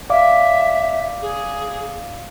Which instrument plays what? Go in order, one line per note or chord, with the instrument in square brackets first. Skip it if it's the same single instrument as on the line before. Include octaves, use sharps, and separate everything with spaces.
[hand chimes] D5 F5 D6 [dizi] E5
[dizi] G#4